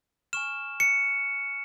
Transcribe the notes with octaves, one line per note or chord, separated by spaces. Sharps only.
G#5 C#6 F6 E7
C#7